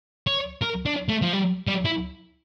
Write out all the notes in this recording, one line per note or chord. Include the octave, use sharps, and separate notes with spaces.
C#5
A#4
D4
A3
F3
G3
G3
E4